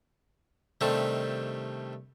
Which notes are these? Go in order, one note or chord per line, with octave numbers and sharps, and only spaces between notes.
C3 D#3 G3 A3 C4 D4